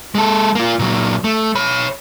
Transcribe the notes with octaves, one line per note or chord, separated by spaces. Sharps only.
G#3 A4
A#3 F4
A#2 F#3
A3
C#5 B5